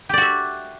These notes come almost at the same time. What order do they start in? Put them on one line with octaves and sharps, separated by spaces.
G4 D5 F#4 E5